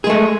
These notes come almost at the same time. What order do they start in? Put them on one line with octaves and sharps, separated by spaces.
G#4 G#3 A3